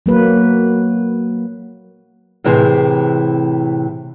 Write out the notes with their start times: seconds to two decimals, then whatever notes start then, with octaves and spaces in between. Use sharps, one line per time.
0.06 F#3 A#3 B4
2.44 A2 C3 E3 G#4 C5